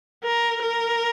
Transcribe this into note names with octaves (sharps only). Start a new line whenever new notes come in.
A#4
A#4